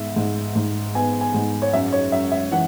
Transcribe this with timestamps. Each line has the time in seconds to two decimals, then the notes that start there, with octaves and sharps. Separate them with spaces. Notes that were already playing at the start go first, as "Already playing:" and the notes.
Already playing: G#2 B3 E5
0.16 G#2
0.55 G#2
0.95 B3 G#5
1.21 G#5
1.34 G#2
1.62 C#5
1.73 F#2 E5
1.93 C#5
2.12 F#2 E5
2.32 E5
2.52 E3 F#5